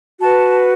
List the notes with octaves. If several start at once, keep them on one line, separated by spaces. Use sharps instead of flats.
F#4 B4 A5